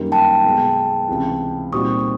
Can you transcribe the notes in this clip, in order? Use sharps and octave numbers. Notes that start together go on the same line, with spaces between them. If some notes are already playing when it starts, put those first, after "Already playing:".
Already playing: F#2 D#3 G3 A#3
G5 A5
B1 B2 G#3
C#2 C3 E3
A#2 G3 C4 D#4 F#4 C#6 D#6